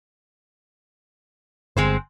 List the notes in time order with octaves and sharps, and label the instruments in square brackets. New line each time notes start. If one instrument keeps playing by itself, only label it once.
[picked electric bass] G1 [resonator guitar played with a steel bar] G#3 C4 C5